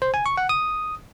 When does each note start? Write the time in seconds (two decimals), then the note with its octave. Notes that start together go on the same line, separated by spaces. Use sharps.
0.02 C5
0.14 G#5
0.26 C#6
0.37 F#5
0.49 D#6